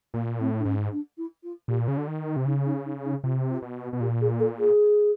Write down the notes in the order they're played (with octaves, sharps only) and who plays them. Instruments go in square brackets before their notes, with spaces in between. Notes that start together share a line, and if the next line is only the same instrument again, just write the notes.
[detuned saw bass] A#2 [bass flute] A#3
[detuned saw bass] A2 [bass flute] C4
[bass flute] D4
[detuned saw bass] G#2 [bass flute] C#4
[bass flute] D4
E4
F4
[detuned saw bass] A#2 [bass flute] G4
[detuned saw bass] C#3
[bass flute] F#4
[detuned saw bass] D3
D#3
C3
[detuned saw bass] C#3 [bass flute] D#4
[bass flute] D#4
D#4
D#4
[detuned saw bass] C3 [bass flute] F4
[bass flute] F4
[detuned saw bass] B2
[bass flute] F#4
[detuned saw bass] B2
[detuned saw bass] A#2 [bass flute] G4
[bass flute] G#4
A4
G#4